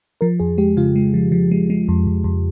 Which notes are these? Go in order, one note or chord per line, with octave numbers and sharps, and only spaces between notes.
F3 A#4
F2 G#4
G#3 G4
C#3 F4
G#3
F3
F3
G#3
G#3
F2
F2
F2